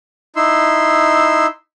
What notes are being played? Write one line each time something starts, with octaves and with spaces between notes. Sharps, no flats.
D#4 E4 C6 E6